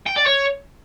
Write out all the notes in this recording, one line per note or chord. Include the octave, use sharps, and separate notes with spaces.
G5
D5
C#5